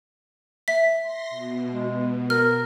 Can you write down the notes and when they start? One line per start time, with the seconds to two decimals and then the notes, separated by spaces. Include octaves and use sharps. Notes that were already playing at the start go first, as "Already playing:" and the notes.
0.68 E5 B6
1.01 C6 A#6
1.30 B2
1.72 G#3
2.30 A#4 F6